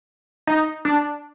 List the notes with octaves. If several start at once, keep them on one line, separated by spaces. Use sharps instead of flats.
D#4
D4